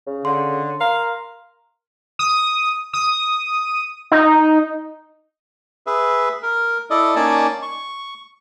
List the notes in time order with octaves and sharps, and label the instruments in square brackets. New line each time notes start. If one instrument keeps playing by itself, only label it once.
[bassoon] C#3
[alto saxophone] D3 [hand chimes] C6
[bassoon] A#4 [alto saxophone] F5
[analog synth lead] D#6
D#6
D#4
[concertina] G#4 B4 E5
A#4
E4 A4 D5 D#5
A#3 C#4 D#4 D5 G#5 A5
C#6